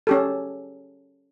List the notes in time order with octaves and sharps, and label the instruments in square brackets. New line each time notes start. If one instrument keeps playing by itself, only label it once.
[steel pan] C#4 G4 A4